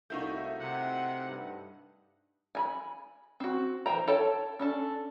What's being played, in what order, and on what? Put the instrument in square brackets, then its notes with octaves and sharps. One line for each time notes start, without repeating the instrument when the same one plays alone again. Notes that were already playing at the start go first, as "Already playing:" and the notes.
[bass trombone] C2 [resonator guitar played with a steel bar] A3 A#3 F#4 [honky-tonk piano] D#4 E4 G6
[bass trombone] C3 [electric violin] F#5
[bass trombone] G2
[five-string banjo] G#5 A#5 B5
C4 F#4
E3 C5 G5 A#5
A4 C#5 G5 A5
C#4 D4 A4